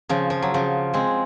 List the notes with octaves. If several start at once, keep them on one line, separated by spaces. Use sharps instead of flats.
C#3 F3
F3
F#3
C#3 F3
G#3 C4